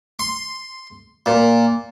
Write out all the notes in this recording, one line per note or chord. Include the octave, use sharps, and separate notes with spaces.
C6
A#2